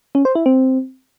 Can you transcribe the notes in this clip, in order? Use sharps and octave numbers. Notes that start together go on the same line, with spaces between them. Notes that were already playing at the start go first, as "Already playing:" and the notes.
C#4
C5
E4
C4